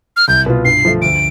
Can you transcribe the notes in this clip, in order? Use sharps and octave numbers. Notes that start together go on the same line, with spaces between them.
F6
C2 G6
B2 B3 F4
G2 C7
D3 F3 A3
D2 D7